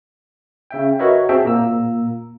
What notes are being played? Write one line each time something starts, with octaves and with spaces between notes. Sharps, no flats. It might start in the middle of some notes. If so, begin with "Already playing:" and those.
C#3 E5 G5
F#4 A#4 B4 C#5 D#5 E5
C4 F#4 G#4 E5 G5 A5
A#2 A#3 A#5 E6